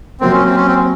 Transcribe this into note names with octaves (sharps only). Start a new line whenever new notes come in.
C3 F#3 A#3 C4
C#4
C4
C#4
C4